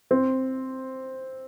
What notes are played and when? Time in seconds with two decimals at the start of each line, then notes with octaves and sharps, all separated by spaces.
0.11 C4